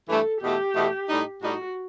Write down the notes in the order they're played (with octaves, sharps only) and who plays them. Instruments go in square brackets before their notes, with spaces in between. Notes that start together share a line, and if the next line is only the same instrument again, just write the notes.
[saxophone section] G2 E3 A3 [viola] A4
[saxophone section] E2 B2 A3 [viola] G4
[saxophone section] E2 B2 A3
A2 G3 D#4
[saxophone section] A2 G3 D#4 [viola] F#4